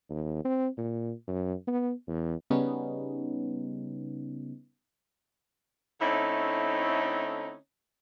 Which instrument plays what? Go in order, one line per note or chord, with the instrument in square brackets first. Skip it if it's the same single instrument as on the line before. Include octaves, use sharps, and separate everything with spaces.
[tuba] D#2
C4
A#2
F#2
B3
E2
[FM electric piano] C#3 G3 B3 C#4 D#4
[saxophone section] D3 A3 C4 C#4 D#4 E4